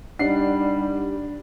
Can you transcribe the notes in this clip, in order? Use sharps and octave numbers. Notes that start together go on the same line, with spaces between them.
G3 D4 D#4 G4 F#5 C7